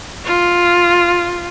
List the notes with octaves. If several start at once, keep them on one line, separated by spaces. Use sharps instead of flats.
F4